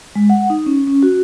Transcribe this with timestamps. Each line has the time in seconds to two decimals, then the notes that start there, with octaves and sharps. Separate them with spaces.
0.15 G#3
0.30 F#5
0.50 D#4
0.66 C#4
0.87 C#4
1.03 F#4